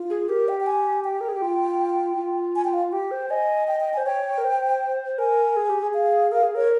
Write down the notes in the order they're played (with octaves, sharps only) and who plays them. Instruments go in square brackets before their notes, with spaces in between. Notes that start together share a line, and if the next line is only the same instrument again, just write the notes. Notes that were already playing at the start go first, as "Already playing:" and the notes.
Already playing: [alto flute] F4
[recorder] G#4
[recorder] G4 [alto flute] A#4
[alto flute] G5
G5
G#5
G5
[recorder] A#4
G#4
G4
F4
F4
[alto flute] G#5
G5
F5
[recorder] G4 [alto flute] G5
[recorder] C5
[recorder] D#5 [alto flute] G#5
[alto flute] G5
G5
[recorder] C5 [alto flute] G#5
[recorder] C#5 [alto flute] G5
[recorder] A#4
C5
[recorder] A#4 [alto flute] G#5
[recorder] G#4
G4
G#4
[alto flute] F5
[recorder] A#4 [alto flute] F5
[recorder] G#4
[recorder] A#4 [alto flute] C#5